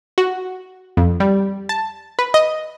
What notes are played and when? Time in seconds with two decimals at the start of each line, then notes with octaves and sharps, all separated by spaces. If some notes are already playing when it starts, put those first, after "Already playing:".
0.18 F#4
0.97 F2
1.20 G3
1.69 A5
2.19 B4
2.34 D#5